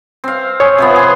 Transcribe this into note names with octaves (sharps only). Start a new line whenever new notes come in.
C4 F5
G#4 C#5
C3 F3 B3
G#4 C6